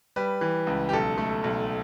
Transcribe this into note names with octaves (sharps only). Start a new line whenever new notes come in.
G3 B4
E3
C#2
G4
B1 A4
A3
B1